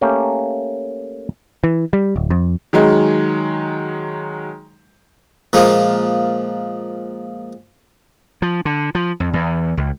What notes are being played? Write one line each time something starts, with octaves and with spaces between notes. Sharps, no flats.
A3 A#3 C#4 G4
E3
G3
D1
F2
D#3 F#3 G#3
A#2 F3 G#3 A#3
F3
D3
F3
F2
E2
C#2